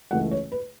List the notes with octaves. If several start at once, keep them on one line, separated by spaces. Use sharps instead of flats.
C#2 C#3 E3 A3 F#5
C#5
B4